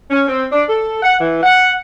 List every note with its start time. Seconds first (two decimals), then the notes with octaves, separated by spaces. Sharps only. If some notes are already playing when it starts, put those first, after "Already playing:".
0.10 C#4
0.28 C4
0.52 D4
0.69 A4
1.02 F#5
1.20 E3
1.43 F#5